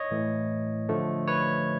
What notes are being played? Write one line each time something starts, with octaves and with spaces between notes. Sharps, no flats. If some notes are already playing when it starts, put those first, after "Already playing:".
Already playing: C#5 D#5
A2 E3 A3
D3 F3 A3
B4 C#5